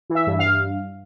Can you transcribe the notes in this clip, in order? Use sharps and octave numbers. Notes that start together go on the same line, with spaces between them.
E3
E5
G2
F5
G2